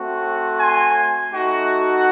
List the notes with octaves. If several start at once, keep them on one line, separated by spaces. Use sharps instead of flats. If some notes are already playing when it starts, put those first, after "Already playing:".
Already playing: A3 C4 F#4
G#5 C6
A3 D#4 F#4